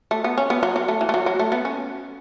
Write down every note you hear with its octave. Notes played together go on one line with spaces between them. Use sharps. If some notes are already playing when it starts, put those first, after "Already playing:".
A3
B3
C#4
B3
F#3
F#3
A3
E3
A3
F#3
F#3
A3
B3
C#4